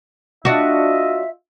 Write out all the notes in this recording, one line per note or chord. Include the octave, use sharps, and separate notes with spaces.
D4 F4 F#4 D#5 E5